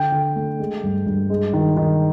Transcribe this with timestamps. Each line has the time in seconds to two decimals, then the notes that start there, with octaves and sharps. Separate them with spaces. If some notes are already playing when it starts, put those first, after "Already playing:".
Already playing: D3 G5
0.12 D3
0.36 A3
0.59 G#3
0.83 G2
1.06 G2
1.30 G#3
1.53 D#3
1.77 D#3